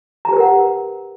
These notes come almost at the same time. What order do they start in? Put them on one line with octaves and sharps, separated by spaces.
A#5 G4 B4 A#4 F#5